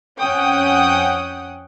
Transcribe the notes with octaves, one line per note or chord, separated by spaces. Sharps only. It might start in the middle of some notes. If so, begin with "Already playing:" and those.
F2 C#4 F#5 G5 D#6